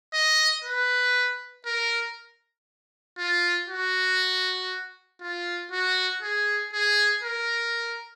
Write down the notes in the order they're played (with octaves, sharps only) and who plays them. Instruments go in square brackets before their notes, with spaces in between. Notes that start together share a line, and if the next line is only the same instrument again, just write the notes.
[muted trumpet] D#5
B4
A#4
F4
F#4
F4
F#4
G#4
G#4
A#4